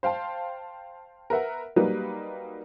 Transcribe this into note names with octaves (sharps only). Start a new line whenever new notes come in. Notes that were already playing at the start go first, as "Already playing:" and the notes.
C5 F5 G5 A5
A#4 B4 E5 F#5
F#3 G3 A#3 D#4 B4